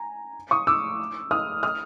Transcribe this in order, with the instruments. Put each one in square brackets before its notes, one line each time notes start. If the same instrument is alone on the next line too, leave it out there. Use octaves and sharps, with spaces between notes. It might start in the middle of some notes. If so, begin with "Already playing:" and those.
Already playing: [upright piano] G#5 A#5
C#6 D#6
D6 E6
D#6 F6
D#6 F6